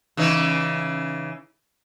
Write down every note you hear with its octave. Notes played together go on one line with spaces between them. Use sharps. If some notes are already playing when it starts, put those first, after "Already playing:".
C#3 E3 D#4